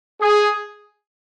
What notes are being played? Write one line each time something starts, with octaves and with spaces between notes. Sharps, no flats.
G#4